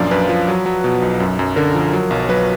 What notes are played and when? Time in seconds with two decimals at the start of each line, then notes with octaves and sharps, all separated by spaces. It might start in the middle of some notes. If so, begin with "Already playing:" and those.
Already playing: F#2 A#2 F3 D4 F4 D5 F5
0.11 F#2 B4
0.29 F3
0.48 F#3
0.66 F#3
0.84 B2
1.02 B1
1.20 F#2
1.39 F#2
1.56 D3 A#4
1.74 F3
1.93 F#3
2.11 B1
2.29 F#3 B4